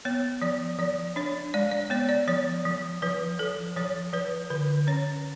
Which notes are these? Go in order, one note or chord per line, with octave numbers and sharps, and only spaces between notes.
B3 C#5
F3 D5
F3 D5
D4 C#5
G#3 D5
D5
B3 C#5
D5
F3 C#5
F3
F3 B4
F3 A4
F3 C#5
F3 B4
D3 B4
C#4 C#5